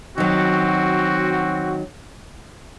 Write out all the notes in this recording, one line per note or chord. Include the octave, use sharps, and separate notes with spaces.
D#3 F#3 C4 F#4